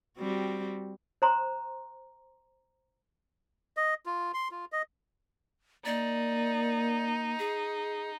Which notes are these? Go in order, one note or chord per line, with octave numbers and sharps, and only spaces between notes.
G3 C4 F#4
C5 A#5 C6
D#5
F4
C6
F4
D#5
A#3 D#4 D5
G#4